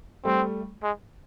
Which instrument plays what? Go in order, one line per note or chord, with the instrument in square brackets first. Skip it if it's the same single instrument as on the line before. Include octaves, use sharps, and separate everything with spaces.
[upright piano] G3 A3 [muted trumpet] C4
[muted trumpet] G#3